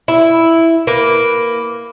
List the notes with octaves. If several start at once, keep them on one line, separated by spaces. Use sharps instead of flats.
E4
A#3 B4